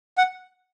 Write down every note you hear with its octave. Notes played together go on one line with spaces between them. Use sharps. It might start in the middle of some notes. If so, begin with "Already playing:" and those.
F#5